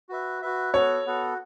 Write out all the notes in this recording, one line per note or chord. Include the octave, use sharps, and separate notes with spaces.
F#4 B4 E5
F#4 B4 E5
B3 F#4 A4 C#5
B3 F#4 A4